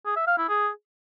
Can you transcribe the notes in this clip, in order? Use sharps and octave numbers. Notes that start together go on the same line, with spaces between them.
G#4
E5
F5
E4
G#4